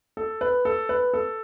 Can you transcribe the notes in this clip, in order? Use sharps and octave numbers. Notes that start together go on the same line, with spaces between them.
A4
B4
A4
B4
A4